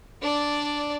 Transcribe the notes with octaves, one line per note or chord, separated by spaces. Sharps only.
D4 D5